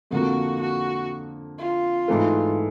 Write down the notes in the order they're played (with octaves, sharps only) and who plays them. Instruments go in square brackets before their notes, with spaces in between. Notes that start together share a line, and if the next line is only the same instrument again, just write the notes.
[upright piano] F2 D3 F3 A#3 [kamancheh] F#4
[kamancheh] F#4
F4
[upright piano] G#2 E3 A3